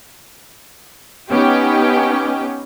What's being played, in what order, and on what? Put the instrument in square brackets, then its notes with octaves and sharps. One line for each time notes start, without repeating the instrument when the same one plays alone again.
[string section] B3 C#4 D#4 G4 G5